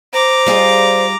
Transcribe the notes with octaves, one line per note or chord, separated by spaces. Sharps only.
C5 A#5 D6
G3 F4 G#4